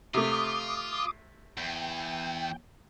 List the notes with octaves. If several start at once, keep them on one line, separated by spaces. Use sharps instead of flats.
C3 A3 F4 D6 D#6
E2 G5